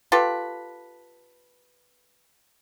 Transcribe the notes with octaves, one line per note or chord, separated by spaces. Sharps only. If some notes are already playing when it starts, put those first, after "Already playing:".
F4 G4 A4 B4